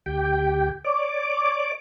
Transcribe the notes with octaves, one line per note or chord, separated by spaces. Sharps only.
D2 G4 G5
C#5 D5 D6